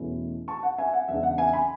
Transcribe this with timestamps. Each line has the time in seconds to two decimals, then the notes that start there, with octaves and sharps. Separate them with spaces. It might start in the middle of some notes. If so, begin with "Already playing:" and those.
Already playing: E2 B2 A3 C#4 E4
0.48 A5 C#6
0.63 F#5
0.78 E5 G#5
0.93 F#5
1.08 E2 C#3 G#3 D4 E5
1.23 F#5
1.38 E5 G#5
1.53 G#5 B5